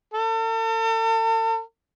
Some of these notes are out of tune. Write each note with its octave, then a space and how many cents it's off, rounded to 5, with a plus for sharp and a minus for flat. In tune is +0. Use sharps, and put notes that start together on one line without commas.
A4 +40